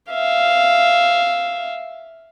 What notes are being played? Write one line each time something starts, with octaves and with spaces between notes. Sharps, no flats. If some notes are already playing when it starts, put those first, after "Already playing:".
E5 F5